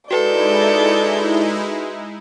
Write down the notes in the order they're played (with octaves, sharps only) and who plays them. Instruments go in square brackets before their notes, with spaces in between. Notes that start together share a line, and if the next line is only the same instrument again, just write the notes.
[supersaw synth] G#3 D#4 E4 [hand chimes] F#4 B4 [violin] A4 G6 [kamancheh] D5